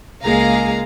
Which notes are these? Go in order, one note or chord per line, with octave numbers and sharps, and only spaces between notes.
C#2 G#3 A#3 G#4 F5 A#5